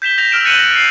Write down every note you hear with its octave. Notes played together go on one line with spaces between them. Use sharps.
G6 B6 E7 G7
G6 A#6 F7
E6 F6 D7 E7
F#6 A6 C#7 D#7 E7 F#7
A#6
C7